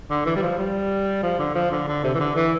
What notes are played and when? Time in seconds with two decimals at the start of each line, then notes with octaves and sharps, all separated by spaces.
0.10 D3
0.26 E3
0.36 G3
0.42 F3
0.59 G3
1.23 F3
1.39 D3
1.55 F3
1.71 D3
1.88 D3
2.04 C3
2.15 E3
2.20 D3
2.36 E3